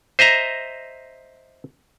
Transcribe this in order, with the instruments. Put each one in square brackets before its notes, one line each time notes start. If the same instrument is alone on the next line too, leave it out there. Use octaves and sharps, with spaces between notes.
[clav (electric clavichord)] C5 D#5 E5 A#5